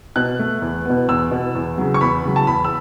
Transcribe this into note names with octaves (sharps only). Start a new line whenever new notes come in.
B2 F#6
A3
E2
B2 B3
E2 E6
B2 B3
E2
C#3 F#3
C#6
E2 B5
C#3 F#3
A5
E2 B5
E6